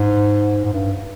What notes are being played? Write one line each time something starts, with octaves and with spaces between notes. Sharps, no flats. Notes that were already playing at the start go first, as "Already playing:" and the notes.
Already playing: G#2
G#2
G2